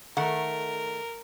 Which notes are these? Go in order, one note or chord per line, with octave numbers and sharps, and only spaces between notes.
D#3 A3 A#4 F#5